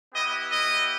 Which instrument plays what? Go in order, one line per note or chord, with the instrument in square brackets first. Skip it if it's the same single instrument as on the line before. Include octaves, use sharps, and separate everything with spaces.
[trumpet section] B3 E4 G4 D#5
D#5